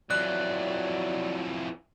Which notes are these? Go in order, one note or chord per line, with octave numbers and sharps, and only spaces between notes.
F2 E3 F#3 D5 F#6